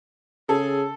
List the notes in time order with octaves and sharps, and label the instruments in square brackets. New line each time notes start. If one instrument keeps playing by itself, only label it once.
[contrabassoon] C#3 [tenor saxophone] G#4 [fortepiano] A4